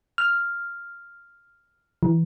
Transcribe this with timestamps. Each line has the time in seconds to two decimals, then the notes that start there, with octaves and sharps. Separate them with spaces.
0.18 F6
2.03 E3